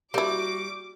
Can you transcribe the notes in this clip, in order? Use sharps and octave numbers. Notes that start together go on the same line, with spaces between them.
G3 A#3 E4 F#4 D6